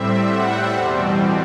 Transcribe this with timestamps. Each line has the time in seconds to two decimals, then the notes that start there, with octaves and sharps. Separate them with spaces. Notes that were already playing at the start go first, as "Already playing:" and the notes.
Already playing: A2 G3 C4 E5
0.27 F#5
0.72 E2 B2 G3 C4